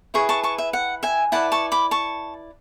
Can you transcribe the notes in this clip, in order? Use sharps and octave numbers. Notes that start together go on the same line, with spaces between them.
E4 G#4 B4 C#6
A5 C#6
A5 C#6
E5
F#5
E5 G#5
E4 B4 D5 F#5 A5
A5 C#6
B5 D6
A5 C#6